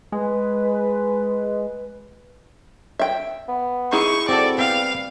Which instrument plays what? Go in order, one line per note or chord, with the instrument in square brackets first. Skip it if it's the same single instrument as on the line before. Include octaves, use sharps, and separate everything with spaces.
[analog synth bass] G#3 [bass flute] B4
[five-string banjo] E5 G5
[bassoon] B3
[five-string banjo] D#4 E4 G#4 [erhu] C#6
[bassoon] G3 [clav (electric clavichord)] C4 F#4 A4 [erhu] D5
[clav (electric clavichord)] B3 C4 G5 [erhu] F5